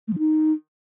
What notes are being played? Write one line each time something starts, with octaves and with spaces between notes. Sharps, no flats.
A3
F3
D#4